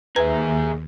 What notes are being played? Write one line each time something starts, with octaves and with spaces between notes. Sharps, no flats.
D#2 D#4 G#4 B4 E5 G#5 A#5